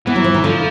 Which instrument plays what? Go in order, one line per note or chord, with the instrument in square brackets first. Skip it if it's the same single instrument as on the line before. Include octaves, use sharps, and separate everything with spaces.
[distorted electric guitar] E3 [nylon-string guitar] B3
[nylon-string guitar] F#3
F3
D#3
[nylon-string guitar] D3 [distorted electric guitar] F3